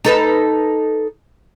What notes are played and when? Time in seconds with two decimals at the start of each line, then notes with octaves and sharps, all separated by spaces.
0.05 D#4 A4 B4